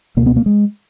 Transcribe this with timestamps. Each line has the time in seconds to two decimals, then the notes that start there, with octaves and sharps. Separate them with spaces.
0.17 C#2 B2 A#3
0.26 B3
0.36 A#3
0.46 G#3